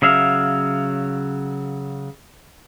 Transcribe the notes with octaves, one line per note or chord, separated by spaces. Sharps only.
C#3 F#3 E5 F5